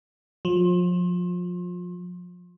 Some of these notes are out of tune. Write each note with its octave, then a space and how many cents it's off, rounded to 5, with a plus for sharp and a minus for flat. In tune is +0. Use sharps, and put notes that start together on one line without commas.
F3 +30